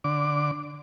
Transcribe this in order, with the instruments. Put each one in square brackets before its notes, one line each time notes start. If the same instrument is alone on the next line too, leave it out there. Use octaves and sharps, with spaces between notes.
[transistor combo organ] D3 D6